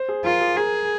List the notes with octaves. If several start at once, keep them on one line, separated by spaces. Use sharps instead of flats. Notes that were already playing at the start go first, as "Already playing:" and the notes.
Already playing: C5
G#4
F4 A#4
G#4
G#4 A#4